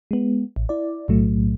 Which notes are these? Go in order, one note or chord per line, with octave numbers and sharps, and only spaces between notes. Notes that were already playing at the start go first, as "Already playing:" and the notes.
G#3 B3
A1
E4 D5
B1 A2 F#3 A3